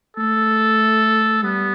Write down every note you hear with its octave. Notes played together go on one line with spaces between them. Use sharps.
A3 A4
G3 B3